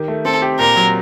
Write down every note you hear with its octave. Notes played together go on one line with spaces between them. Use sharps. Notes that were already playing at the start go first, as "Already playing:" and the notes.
Already playing: D#3 G4
A3
C4 A4
G4
A#2 A#4
F#3